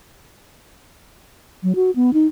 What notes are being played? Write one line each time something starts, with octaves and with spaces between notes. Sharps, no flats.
F#3
F#4
B3
D#4